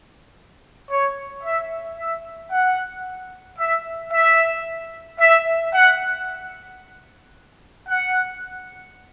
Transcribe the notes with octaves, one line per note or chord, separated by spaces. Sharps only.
C#5
E5
E5
F#5
E5
E5
E5
F#5
F#5